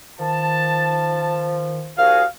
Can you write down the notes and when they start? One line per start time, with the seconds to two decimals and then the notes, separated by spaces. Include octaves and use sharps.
0.19 D#3 F3 A5
1.98 C2 F#4 G#4 F5